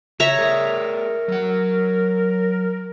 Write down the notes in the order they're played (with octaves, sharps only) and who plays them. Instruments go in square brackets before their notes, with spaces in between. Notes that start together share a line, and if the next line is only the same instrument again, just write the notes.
[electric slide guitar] C#3 [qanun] C#5 E5 A#5
[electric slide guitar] A3 G#4 D5 [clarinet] A#4
[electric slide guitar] F#3 F#5